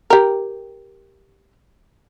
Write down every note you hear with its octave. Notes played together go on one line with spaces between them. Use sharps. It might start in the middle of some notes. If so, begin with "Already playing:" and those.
G4 A#4